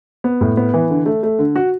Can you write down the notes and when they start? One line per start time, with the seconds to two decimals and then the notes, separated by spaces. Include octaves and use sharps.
0.24 B3
0.41 A2
0.57 B3
0.74 E3
0.90 D3
1.06 A3
1.23 A3
1.39 D3
1.56 F#4